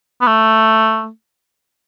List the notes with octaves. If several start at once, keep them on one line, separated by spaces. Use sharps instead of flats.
B3
A3